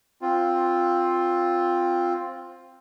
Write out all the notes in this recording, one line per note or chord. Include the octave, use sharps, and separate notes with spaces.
C4 F4